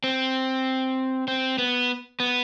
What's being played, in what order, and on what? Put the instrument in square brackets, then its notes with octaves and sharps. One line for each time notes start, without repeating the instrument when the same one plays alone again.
[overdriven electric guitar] C4
C4
B3
B3